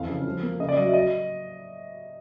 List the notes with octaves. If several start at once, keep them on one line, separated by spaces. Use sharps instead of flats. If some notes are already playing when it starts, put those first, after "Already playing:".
Already playing: F2 E3 F5
C#3
F3
A#3
C#3 D#5
D5
F#3 D#5
E5
D#5